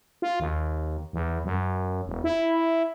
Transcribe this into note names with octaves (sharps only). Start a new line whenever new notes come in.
F4
D#2
E2
F#2
E1
E4